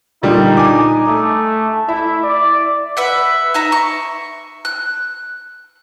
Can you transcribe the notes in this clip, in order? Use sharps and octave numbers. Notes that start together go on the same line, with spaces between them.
A#2 D3 G3 D#4
G#5 D6
A3
E4 E5
D5
B4 E5 F#5
D#4 E5 A#5
C#6
F#6